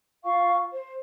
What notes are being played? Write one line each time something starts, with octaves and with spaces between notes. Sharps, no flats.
F4 F5 C#6
C5